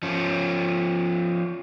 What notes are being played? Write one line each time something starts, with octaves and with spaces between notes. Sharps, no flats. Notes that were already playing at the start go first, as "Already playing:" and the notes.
F3 C#4